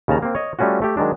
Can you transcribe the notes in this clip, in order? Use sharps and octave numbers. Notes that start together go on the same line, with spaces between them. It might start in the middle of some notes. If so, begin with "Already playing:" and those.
D#2 C#3 C#4 A5 A#5
A#3 C4
C#5 D#5
G3 A3 C#4 F4 F#4
A3 G4
D#3 F#3 G#3 D4